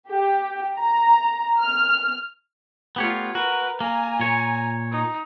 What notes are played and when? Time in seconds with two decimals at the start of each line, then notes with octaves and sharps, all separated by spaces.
0.10 G4
0.78 A#5
1.60 F6
2.96 A3 B3 F4 G4 C#5
3.35 F#4 A#4 B4
3.81 A#3 G#5 A#5
4.20 A#2 C#5
4.91 D#4